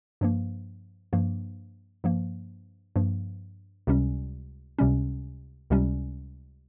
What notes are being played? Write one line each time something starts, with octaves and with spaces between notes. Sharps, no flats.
G2 F3 A#3
G2 F3 A#3
G2 F3 A#3
G2 F3 A#3
C#2 C3 G3 C#4
C#2 C3 G3 C#4
C#2 C3 G3 C#4